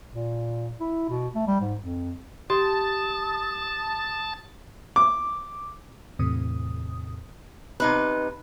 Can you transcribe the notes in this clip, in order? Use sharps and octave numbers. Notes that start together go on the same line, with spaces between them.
A#2
E4
B2
A3
G3
G#2
F2
G4 A5 C6 D#6
D6
E2 A2 C3 D#6
C3 D#4 B4